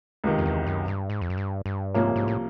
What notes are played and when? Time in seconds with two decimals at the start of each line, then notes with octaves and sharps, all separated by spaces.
0.24 C#2 C3 D#3
0.38 F2
0.45 E2
0.67 F#2
0.88 G2
1.10 G#2
1.21 F2
1.30 F#2
1.37 G2
1.66 G2
1.94 C2 G#2 C3 F3 A#3 C#4
2.16 G#2
2.28 A2